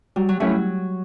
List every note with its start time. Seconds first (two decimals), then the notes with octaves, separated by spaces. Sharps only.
0.16 F#3 G3
0.29 F#3
0.40 F#3 A3 C#4 E4